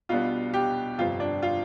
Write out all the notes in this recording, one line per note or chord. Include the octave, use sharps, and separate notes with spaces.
B1 B2 G3 B3 D4 F4
G4
G1 F2 C3 G3 C4 F4
D4
F4